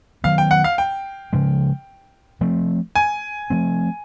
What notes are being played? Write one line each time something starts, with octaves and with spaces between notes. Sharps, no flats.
D#3 F#3 B3 F5
G5
F#5
F5
G5
C#3 F3 G#3
F3 A3 C4
G#5
F3 A3 C4